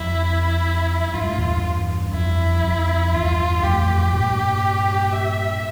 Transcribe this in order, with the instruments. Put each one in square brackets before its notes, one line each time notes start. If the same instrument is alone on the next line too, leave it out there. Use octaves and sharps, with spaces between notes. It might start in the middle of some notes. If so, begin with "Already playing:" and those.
Already playing: [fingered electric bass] F2 [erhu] E4
[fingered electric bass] G2 [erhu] F4
[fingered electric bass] A2
E2 G2
[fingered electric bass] F2 [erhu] E4
[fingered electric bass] F2
[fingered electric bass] E2 G2 [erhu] F4
[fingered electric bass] F2 A2 [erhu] G4
[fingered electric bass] G2 A#2
[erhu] E5